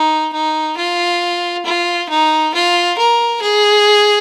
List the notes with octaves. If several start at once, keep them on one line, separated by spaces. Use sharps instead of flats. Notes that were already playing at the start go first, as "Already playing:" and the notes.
Already playing: D#4
D#4
F4
F4
D#4
F4
A#4
G#4